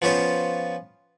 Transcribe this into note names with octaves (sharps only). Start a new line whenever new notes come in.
F3 B3 C#4 F4 C5